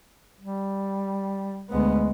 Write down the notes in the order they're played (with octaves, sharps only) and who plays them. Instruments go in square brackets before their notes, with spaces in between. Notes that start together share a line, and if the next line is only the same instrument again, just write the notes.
[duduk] G3
[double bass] D2 B3 [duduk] G#3